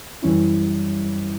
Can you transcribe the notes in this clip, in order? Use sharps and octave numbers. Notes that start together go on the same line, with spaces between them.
F#2 E3 G3 C#4 E4